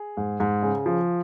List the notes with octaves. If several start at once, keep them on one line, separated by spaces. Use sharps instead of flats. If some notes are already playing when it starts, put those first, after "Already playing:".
Already playing: G#4
G#2
G#2
C#3
F3